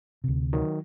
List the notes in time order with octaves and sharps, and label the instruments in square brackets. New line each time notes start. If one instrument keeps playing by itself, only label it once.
[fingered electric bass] D2 C3
[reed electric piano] D#3 F#3